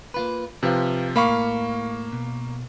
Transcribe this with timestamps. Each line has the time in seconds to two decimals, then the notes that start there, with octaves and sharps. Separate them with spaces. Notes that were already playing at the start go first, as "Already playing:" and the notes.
0.14 A#3 F4 B4
0.63 C3 F3 B4 F5
1.16 A2 A#3 F5 B5 C#6
2.12 B2